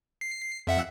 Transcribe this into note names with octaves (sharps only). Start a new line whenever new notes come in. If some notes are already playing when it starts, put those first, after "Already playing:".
C7
F2 E5 F#5